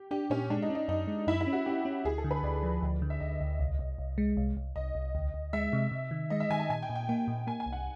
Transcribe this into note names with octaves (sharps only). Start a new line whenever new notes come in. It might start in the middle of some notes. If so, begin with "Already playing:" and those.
Already playing: G4
D4 G4
A#2 C#4
G#3 D4
D#4
C#4
D#4
F#2 D#4
G#3
F#2 E4
E4
C#4
F#4
C#4 G4
C#4
D2 G#4
A4
D3
B4
D2 D5
F3
D2
D3
E5
D2 D#5
D2
C2
C2
C2
G#3
C2
C2
C2 D#5
C2
D2
D2
G#3 E5
C3
C3
D#3
G#3 D#5
E5
D#3 G#5
A5
A#2 G#5
G5
A#2
G5
A#3 G5
A#2
A#3 G#5
G#5
C2
F#5